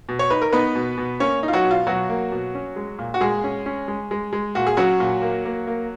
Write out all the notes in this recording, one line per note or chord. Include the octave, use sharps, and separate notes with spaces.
B2
C#5
D#4 B4
A#4
B3 D#4 B4
B2
B2
A#3 C#4 C#5
D#4
F4
F#3 F#4
B2
F4
B2 F#3 F#4
A#3
B2
C#4
G#3
A#2
F#4
A#2 G#3 G#4
C#4
C#4
G#3
G#3
G#3
A#2 F#4
G#4
F#3 C#4 F#4
A#2
A#3
A#3
A#3